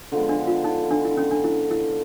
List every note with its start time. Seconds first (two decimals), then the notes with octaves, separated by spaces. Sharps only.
0.12 D3 F3 G#3 B3
0.29 D4
0.47 F4
0.64 D#4
0.91 D4
1.05 E4
1.17 C#4
1.31 D4
1.44 E4
1.71 E4